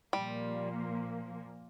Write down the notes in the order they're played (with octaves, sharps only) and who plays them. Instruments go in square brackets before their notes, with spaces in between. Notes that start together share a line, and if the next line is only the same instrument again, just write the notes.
[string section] A#2 F3 A#3 [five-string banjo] G3